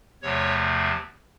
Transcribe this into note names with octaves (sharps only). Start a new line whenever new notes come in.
E2 C3 F3 A3 C#5